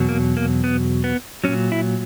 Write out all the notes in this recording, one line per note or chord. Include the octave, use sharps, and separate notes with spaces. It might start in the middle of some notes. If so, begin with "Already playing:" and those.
Already playing: E2 B2 F#3
A#3
A#3
B3
B3
A#2 F#3 C#4
E4